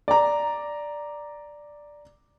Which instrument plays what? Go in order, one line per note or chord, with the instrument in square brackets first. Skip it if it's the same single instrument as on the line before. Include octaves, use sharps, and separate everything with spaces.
[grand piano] D5 A#5